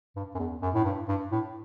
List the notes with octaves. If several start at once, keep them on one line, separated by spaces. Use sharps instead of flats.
G2
F#2
E2
F#2
A2
G2
G2
A2